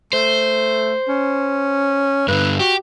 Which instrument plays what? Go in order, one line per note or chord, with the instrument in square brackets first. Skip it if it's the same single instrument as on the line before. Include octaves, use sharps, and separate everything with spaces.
[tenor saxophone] A3 [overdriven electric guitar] C5
[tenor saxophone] C#4
[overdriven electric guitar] G2 D3 [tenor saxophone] B4
[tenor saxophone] F#4 [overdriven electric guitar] G4